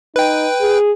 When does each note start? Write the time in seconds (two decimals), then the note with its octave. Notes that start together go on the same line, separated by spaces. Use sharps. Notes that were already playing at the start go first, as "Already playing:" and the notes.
0.16 D#4 B4 G5
0.61 G#4